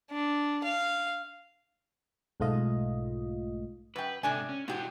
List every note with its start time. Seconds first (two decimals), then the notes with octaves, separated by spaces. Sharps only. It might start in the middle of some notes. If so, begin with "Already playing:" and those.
0.11 D4
0.64 F5
2.40 B1 G#2 A3 F4 D#5
3.96 F#2 B4 G5
4.23 G#2 C3 D4 A4 D5 G#5
4.49 C#4
4.68 G#2 B3 E4 F#4 G4